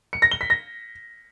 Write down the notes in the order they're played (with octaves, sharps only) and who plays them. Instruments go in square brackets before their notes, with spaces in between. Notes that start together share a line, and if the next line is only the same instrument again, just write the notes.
[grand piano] C#7
A#6
G7
B6
A#6